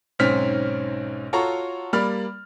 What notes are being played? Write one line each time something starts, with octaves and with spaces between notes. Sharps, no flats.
B1 G#2 C4 C#4 F6 B6
F4 F#4 A4 C#5 A#5 C#6
G3 A#3 D5 B5 F6